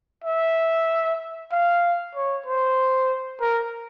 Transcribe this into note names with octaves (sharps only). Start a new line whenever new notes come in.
E5
F5
C#5
C5
A#4